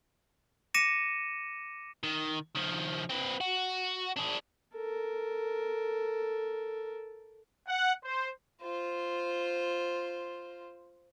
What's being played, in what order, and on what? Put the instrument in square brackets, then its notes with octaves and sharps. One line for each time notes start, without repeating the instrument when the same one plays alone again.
[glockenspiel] D6 A#6 C#7 D#7 E7
[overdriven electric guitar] D#3
D#3 F3
C4 B4
F#4
D4 G#4
[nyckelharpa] A4 A#4
[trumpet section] F#5
C5
[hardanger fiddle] F4 C5